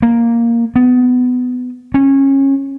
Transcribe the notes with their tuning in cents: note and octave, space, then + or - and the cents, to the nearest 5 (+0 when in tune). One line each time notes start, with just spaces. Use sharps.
A#3 +0
B3 +20
C#4 -25